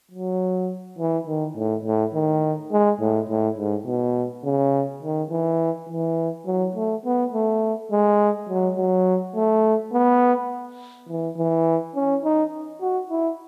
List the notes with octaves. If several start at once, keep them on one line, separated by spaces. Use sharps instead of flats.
F#3
E3
D#3
A2
A2
D#3
G#3
A2
A2
G#2
B2
C#3
D#3
E3
E3
F#3
A3
B3
A3
G#3
F#3
F#3
A3
B3
E3
E3
C#4
D#4
F#4
E4